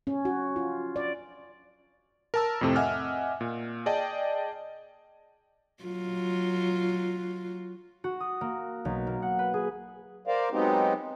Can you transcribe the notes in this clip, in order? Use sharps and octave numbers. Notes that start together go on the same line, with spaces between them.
C#4
F#4
F4
D5
A#4 A5 E6
F2 A2 C3 C4 A4
D#5 E5 F#5 G#5 D6 F6
A#2
G#4 D5 D#5 G5 A5
F#3 F4
F#4
D#6
A#3
B1
A#3
F#5
B4
G#4
A#4 C5 D5 F5
F#3 G#3 B3 C4 D#4 G4